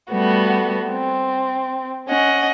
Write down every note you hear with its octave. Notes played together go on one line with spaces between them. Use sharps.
G3 A3 B3 F#4
C4
C#4 D#5 F#5